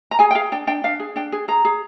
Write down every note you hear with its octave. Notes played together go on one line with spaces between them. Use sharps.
A#5
G#4 G#5
G5
G#4 F5
D4 G5
D4 G5
D4 F5
G#4
D4 G5
G#4
G#4 A#5
G#4